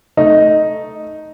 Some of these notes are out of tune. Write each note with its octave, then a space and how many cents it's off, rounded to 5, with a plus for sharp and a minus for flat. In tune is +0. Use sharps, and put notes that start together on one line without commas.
A3 +0 D#4 +0